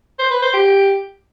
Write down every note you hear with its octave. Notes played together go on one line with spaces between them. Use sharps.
C5
B4
C5
G4